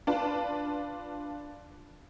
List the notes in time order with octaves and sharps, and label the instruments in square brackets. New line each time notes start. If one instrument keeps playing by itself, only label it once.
[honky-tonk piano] D4 F4 B4 A5